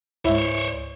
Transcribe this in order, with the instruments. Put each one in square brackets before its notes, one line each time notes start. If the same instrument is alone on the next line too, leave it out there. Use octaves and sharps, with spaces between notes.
[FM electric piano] C#2 G#2 [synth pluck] E4 E5 [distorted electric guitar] C5 C#5